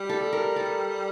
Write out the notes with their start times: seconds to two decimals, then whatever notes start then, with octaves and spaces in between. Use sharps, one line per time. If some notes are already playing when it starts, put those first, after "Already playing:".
Already playing: G3 G4
0.09 A4
0.33 A#4
0.56 A4